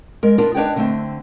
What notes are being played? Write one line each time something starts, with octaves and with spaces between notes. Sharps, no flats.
G#3 A#4
B3 D4 F4 A#4
D4 B4 C#5 D#5 F#5 G5
D3 A3 C4